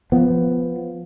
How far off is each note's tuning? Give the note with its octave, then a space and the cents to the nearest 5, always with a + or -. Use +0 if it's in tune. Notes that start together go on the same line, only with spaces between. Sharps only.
F3 +0 B3 +5